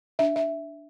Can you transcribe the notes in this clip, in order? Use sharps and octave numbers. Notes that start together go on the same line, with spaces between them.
D4 E5
E5